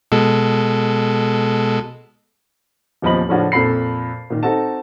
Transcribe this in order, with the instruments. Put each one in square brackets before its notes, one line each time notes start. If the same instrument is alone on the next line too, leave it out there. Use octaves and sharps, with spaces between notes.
[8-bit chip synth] B2 G#3 A4
[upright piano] D#1 E2 F3 D#5 B5 F#7
A2 C#3 F3 C#4 D4 F#4
F2 A#2 A4 B5 C7
A#2 D#3
C4 D#4 F#4 A4 A5